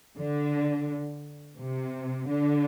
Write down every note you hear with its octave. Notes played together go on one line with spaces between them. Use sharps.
D3
C3
D3